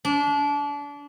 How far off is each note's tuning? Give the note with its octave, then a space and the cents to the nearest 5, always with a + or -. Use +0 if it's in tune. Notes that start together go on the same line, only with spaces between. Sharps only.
D4 -30